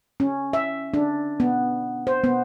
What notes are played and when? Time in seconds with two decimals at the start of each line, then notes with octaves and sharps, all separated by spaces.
0.20 C#4
0.53 E5
0.94 D4
1.40 B3
2.07 C5
2.24 B3